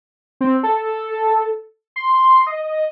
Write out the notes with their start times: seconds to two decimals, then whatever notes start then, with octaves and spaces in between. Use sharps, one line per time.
0.41 C4
0.63 A4
1.96 C6
2.47 D#5